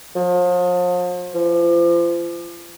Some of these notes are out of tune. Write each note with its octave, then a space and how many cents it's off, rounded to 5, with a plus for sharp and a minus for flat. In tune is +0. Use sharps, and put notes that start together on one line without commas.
F3 +40
F3 -35